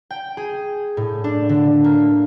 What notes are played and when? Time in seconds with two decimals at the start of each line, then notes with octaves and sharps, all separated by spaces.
0.10 G5
0.37 G#4
0.97 A2
1.24 D4
1.49 D3
1.84 A#3